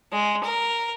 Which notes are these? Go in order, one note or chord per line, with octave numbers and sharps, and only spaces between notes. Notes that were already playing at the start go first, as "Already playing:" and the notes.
G#3
A#4